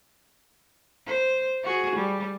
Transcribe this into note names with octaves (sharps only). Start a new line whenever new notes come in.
C5
F#4 G#4
G3